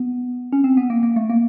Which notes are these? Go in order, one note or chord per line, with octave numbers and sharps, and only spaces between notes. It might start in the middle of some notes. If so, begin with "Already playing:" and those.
Already playing: B3
C#4
C4
B3
A#3
A#3
A3
A#3